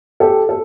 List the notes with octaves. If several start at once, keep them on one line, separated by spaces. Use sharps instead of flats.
G4 A4
A4